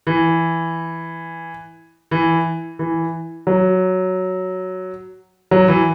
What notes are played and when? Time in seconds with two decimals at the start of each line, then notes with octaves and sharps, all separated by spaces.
0.07 E3
2.11 E3
2.79 E3
3.47 F#3
5.51 F#3
5.68 E3